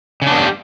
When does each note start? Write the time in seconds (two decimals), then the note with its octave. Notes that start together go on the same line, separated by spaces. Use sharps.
0.22 C#3
0.27 D4
0.31 B3
0.36 G3